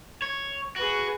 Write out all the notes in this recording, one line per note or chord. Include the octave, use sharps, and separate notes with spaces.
C#5
F#4 G#4 B4